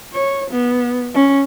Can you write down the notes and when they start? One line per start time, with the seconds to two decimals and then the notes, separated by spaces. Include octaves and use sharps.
0.14 C#5
0.51 B3
1.15 C#4